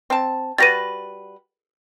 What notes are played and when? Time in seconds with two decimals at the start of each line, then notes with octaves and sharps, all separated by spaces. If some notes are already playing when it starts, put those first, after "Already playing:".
0.10 C4 A5
0.58 G3 F#4 B4 A6 A#6 D#7